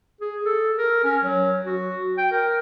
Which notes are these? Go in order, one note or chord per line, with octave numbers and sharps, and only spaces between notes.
G#4
A4
A#4
C#4
F#3
F#4
G5
A#4